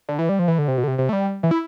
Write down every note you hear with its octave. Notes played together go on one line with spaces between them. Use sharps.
D3
E3
G3
F3
E3
D3
C3
B2
D3
C3
C3
A3
G3
E3
E4